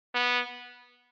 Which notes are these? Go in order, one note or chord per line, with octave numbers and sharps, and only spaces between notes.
B3